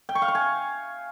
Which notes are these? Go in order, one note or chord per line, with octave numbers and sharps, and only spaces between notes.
G5
C#6
F5
C#6
G#5